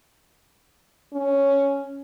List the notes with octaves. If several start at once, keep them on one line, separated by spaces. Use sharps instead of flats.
C#4